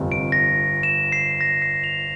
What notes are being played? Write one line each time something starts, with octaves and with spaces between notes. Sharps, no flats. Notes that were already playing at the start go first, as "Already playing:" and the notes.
Already playing: G1 F2 C3
D7
A#6
E7
C7
A#6
C7
F7